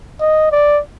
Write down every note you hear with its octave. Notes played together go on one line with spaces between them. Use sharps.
D#5
D5